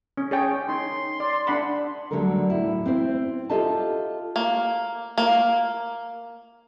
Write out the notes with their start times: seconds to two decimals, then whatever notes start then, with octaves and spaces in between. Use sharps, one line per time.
0.17 C#4
0.31 G#4 C#5 G5
0.69 D#4 C6
1.20 D5
1.47 D4 F#5 B5
2.11 D2 D3 F#3 G3 A4 A#4
2.50 A2 E4
2.86 C4 E4 C5
3.50 F4 G4 A4 D#5 E5 A5
4.36 A#3
5.18 A#3